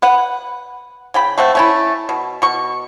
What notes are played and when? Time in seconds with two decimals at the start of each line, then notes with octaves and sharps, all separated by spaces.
0.02 B4 F#5
1.14 C#3 G5 B5
1.38 A3 C4 F#5
1.55 A3 C#4 E4
2.09 B2
2.42 B2 C#6